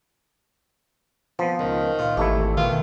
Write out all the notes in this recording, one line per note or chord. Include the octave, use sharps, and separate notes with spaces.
F3 B3 C4
C#2 D#3
A#2 F4
G#1 E3 A3 E4 G4
B2 D#3 F4